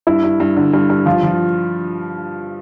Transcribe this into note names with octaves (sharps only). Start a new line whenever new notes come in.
G2 E4
G2
G2
D3
G2
G2
F3 F4
F3